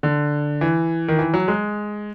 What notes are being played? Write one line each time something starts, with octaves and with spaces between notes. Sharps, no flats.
D3
E3
D#3
E3
F#3
G#3